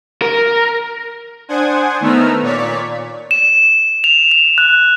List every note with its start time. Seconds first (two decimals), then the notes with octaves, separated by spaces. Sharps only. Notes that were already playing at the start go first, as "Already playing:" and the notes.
0.22 A#4
1.48 D4 C5 F#5 G#5 D#6 G#6
2.00 D#3 A3 B3 A#5 E6 F6
2.41 A#2 C#5 D5 B6
3.31 E7
4.04 F7
4.31 F7
4.58 F#6